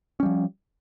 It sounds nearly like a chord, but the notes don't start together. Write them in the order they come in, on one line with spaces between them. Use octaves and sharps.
C#4 G3 F3